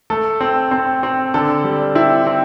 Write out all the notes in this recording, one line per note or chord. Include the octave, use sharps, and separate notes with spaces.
A3 A4
C4
C4
C4
D3 A4
G3
C4 E4
C4